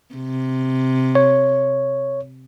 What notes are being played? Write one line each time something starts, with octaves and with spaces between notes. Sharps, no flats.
C3
C#5